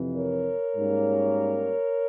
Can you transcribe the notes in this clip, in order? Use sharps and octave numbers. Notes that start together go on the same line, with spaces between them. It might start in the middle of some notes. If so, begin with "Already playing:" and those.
Already playing: F2 C3 E3
A#4 C#5
G#2 G3 A#3 C#4